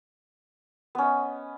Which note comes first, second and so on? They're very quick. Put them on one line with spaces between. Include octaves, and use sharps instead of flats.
B3 C#4 D#5